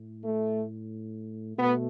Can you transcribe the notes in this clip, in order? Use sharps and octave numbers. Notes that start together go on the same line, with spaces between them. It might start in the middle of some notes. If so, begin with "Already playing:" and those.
Already playing: A2
A3
B2 A3 B3